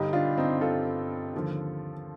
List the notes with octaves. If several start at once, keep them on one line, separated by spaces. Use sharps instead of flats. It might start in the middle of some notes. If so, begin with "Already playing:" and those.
Already playing: G1 G2 D3 D#4 G4
D4 F4
C4 D#4
F4 A4
D#2 D3 F3